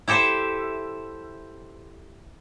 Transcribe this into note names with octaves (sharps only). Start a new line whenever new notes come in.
E4 G4 A4 C5 E5